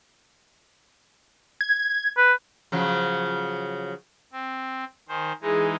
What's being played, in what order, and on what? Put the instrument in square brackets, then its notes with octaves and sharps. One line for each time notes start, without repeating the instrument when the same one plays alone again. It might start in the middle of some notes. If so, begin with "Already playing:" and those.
[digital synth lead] G#6
[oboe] B4
[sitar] C#3 F3 F#3
[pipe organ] C4
[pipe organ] D#3 C5 [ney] G#5
[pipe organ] E3 G#3 D#4 [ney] G#4